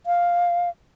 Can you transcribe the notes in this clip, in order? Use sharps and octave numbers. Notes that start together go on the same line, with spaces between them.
F5